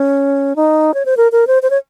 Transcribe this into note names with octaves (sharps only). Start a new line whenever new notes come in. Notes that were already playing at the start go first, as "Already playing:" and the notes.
Already playing: C#4
D#4
C#5
C5
A#4
A#4
C5
C5
C#5